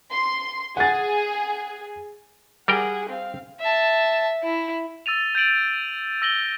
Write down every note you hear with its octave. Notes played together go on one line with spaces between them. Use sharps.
C6
G#4 F#5 A6
G3 G#4 A#4 F#5 G5
C4 F5
E5 A5
E4
E6 A6 D#7 F7
G6 A6 D7 F#7
E6 A#6 F#7 G7